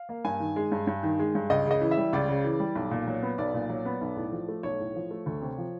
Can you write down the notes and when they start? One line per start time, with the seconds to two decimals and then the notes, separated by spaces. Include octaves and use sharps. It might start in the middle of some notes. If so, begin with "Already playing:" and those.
Already playing: F5
0.09 A#3
0.25 G2 G#5
0.40 D#3
0.56 G#3
0.72 G2
0.87 G2
1.03 D#3
1.19 G#3
1.35 G2
1.50 C#2 D#5
1.66 C#3 D#5
1.81 E3
1.91 E5
1.98 G3
2.13 C#2 D5
2.28 C#3
2.45 E3
2.60 G3
2.75 B1
2.91 A#2
3.07 F#3
3.23 B3
3.38 B1 D5
3.54 A#2
3.69 F#3
3.85 B3
4.01 B1
4.16 A2
4.32 F3
4.48 A3
4.63 B1 C#5
4.80 A2
4.95 F3
5.11 A3
5.26 D2
5.42 C3
5.58 F3